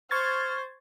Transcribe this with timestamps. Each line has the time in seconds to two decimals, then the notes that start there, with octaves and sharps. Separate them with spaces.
0.11 C5 C#6 F6 G#6 A6